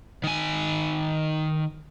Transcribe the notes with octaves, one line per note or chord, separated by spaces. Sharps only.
D#3 G#5